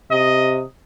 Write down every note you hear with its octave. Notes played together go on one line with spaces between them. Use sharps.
C3 D#5